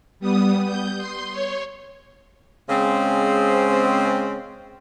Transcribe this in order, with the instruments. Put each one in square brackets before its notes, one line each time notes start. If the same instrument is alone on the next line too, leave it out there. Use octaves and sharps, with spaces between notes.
[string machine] G3 B3 D#6
G6
C6
C#5
[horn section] C#3 G#3 C4